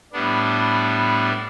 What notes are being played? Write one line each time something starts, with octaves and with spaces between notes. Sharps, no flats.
A2 G3 B3 D4